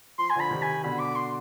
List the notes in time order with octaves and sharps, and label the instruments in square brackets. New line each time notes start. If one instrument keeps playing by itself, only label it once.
[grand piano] F3 [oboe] C6
[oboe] G#5
[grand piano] D3 F3 [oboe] B5
[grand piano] C3 D#3
[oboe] G#5
[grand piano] B2 D3 [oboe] B5
[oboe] D6
C6